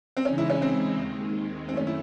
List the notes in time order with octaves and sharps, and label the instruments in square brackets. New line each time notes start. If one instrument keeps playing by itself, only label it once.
[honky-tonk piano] C4
[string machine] C#3 E3 G#3 D#4 [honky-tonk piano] C#4
[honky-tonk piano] E4
C#4
C4
[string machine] D#2 D#3 G#3
[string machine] F#2 D#3 A3 [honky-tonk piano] C4
[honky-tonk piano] C#4
E4